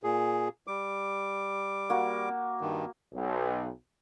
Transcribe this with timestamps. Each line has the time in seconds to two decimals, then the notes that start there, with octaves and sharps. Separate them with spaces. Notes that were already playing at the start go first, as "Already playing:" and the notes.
0.04 A#2 G#4
0.67 G3 D6
1.90 A#3 F#4
2.61 G2 D#3
3.14 B1